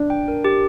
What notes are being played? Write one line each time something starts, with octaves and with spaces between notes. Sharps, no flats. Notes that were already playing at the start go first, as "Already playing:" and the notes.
Already playing: D4
G5
A#4
G4